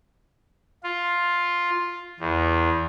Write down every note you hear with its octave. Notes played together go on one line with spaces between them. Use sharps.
F4
E2